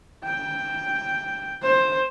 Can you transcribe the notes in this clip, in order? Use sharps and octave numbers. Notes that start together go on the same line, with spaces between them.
G5
C5